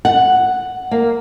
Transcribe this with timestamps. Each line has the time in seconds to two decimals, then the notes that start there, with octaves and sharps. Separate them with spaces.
0.05 F#5
0.91 A#3